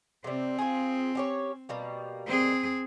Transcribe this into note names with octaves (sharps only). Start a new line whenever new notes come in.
C3 G3 C4
F4 G#4
C#4 G4 C#5
B2 G3 A#3
C4 G#4